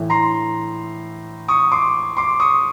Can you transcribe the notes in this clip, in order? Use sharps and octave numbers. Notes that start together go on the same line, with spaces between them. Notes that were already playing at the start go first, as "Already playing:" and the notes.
Already playing: A2 E3
A#5 C6
C#6 D#6
C6 D6
C6 D6
C#6 D#6